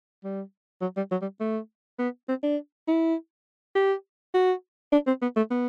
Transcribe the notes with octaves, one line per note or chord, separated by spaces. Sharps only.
G3
F#3
G3
F#3
G3
A3
B3
C4
D4
E4
G4
F#4
D4
C4
B3
A3
B3